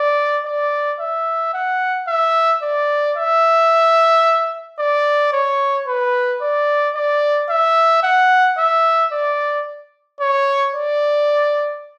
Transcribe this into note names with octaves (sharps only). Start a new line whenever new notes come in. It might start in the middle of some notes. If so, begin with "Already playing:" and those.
Already playing: D5
D5
E5
F#5
E5
D5
E5
D5
C#5
B4
D5
D5
E5
F#5
E5
D5
C#5
D5